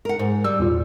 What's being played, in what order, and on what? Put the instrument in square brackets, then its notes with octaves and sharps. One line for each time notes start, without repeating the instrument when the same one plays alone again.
[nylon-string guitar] A#4 F#5
G#2
[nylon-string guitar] G3 [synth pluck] E6
[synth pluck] E2 A#2 F4